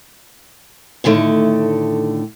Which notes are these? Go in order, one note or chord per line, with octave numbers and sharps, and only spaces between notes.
A2 D3 D#3 A3